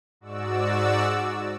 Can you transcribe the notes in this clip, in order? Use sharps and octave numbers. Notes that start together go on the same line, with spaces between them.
G#2 F#4 D5 E6